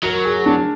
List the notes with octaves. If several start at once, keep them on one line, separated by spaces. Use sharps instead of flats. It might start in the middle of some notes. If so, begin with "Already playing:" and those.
F#3 A#4
G#4
D4